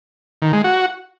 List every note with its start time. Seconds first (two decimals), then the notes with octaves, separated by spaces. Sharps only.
0.42 D#3
0.53 G#3
0.64 F#4